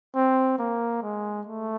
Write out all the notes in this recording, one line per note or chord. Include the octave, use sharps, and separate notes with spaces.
C4
A#3
G#3
A3